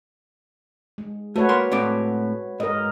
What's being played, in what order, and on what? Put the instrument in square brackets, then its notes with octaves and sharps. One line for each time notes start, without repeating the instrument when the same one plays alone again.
[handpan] G#3
[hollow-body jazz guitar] A3 [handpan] F#4 B4 C#5
[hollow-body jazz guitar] A#3 A#4 C6
A2 C4 D5
[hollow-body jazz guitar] G#2 [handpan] A#4 D#5